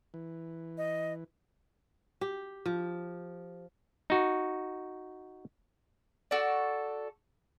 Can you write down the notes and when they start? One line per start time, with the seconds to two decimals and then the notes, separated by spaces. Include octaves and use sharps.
0.14 E3
0.78 D#5
2.21 G4
2.66 F3
4.10 D#4 F#4
6.31 F#4 A4 D5